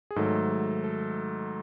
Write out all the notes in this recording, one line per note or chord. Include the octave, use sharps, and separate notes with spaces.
G#4
G#2 D#3 F#3 A3 A4
A4